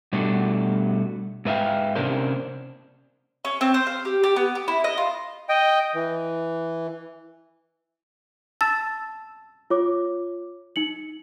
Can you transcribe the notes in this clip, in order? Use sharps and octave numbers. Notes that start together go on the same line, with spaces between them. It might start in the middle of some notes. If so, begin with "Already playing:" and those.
B2 G3 A3 D4 F#4
G#2 B4 E5 F5 G5
C3 A#3 C#4 D4 A#4 C5
C#4
C4
C5
F5
G4
G4
B3
G4
E4
D#5
F4
D#5 G5
E3
A5 E6 A6 E7
F4 C#5 D6
D#4 C#7 F#7